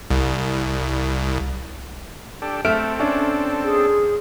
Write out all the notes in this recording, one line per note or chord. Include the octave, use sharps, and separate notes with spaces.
C2
D4 G4 A4
A3 C4 A4 E5 F6 D7
C#4 D4
G#4